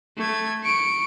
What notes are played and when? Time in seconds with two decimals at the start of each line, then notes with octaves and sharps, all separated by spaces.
0.17 A3 G#6
0.63 C#6 D7